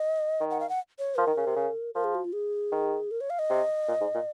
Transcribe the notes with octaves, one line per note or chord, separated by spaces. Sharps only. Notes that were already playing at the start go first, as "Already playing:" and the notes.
Already playing: D#5
D#3
F#5
F5
F#5
C#5
F3 A#4
D#3
C#3
C3
C#3
F3 A#4
G#4
F#4
F4
G#4
D#3
A#4
C#5
F5
D#5
C3
A#2
G#2
A#2